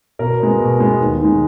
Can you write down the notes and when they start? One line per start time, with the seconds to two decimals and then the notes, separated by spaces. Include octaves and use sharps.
0.19 B2 A#4
0.40 G#3 B3
0.60 B2
0.80 G#3 B3
1.00 D#2
1.21 D#3 G#3